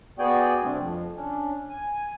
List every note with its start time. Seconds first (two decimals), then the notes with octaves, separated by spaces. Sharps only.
0.19 B3 F#4 G#4 D5 G5 G#5
0.63 C3 G3 A3 C4 D4
0.80 F2 F3
1.16 C#4 D4
1.70 G#5